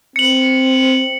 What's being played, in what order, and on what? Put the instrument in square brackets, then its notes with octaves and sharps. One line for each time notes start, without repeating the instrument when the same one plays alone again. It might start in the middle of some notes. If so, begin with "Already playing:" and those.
[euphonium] C4 [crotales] C#7 F#7